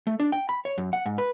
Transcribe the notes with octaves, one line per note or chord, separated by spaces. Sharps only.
A3
D4
G5
B5
C#5
F#2
F#5
G#2
B4